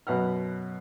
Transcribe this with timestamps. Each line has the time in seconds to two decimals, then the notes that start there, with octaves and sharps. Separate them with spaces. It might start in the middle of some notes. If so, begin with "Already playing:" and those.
0.07 F#2 B2 B4 F#5 F6